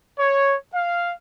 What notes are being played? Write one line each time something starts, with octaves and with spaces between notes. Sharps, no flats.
C#5
F5